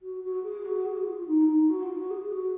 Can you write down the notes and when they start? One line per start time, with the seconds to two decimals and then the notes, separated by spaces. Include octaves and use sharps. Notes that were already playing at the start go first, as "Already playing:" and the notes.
0.01 F#4
0.23 F#4
0.43 G#4
0.65 F#4
0.85 G#4
0.96 F#4
1.06 F4
1.17 F4
1.27 D#4
1.48 D#4
1.69 F#4
1.82 F4
1.97 F#4
2.10 G#4
2.32 F#4